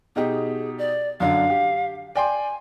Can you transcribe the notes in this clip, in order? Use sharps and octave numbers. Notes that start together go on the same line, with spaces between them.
B2 D#4 G4 G#4
D5
F#2 D3 D4 F5
G4
D5 G5 G#5 C6